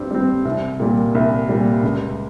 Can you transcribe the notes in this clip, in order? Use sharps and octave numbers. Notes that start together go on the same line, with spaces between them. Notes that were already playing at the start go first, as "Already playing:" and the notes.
Already playing: G2 G3 C4
G3 C4
C2
A#2 G3
C2
A#2 G3
C#2